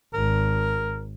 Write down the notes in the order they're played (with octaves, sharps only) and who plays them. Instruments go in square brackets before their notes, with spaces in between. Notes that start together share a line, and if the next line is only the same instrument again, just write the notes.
[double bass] G#1 [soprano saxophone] A#4